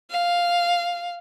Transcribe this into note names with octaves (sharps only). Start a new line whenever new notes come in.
F5